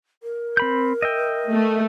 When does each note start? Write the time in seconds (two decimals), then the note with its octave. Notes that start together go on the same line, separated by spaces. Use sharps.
0.23 A#4
0.57 C4 B5 G6
1.02 D#5 E5 G5
1.50 A3